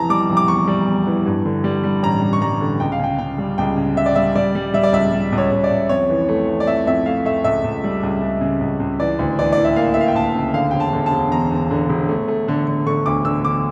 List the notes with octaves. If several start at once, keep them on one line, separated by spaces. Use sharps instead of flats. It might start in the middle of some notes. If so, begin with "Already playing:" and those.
Already playing: F1 E3 A5 A#5
G3 D6
F1
D6
E2 C#6
G3
E2
E3
G2
D3
G3
G3
A1 A#5
G3
C#6
G3 A#5
D3
C#2 G5
F5
C#3 G5
C#3 G5
G3
C#2 G5
C#3
C#3 E5
D5
G3 E5
G3 D5
G3
G3 E5
D5
C#2 E5
G3
C#2
C#5
C#2
D5
C#2
F2 C#5
E3
A3
E3
D5
F2 E5
F2 E5
A3 F5
A3 E5
C#2 E5
C#2
G3
C#2
C#2
C#3
C#2
C#2
E3 D5
D2
E3 D5
E3 D5
E5
A#3 F5
E5
A#3 F5
G5
D2 A5
C#3
D3 F5
E1 G5
A5
D3
A5
E1
E2 A#5
E2
D3
E1
A3
A3
D3
D3
D3 C#6
D2 D6
D3 E6
D3 D6